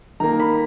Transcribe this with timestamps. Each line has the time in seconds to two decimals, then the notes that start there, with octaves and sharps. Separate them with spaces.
0.20 D#3 A#3 A#5
0.40 B5